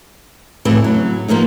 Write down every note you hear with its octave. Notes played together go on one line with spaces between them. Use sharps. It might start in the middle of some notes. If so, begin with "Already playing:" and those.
F2 A2 C#3 E3
F#3
F3 A#3 B3 D#4